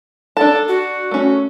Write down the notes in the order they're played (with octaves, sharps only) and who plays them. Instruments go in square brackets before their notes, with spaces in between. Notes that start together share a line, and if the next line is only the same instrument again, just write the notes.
[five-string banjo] D4 A5 [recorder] A4
[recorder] F#4
[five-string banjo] A3 C#4